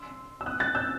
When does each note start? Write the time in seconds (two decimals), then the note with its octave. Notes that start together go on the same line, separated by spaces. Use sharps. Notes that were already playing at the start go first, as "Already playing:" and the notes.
Already playing: C6 E6
0.41 E6
0.46 D#6 F#6
0.60 F#6 A6
0.75 E6 G6